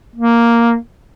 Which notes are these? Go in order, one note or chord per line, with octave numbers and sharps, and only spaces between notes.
A#3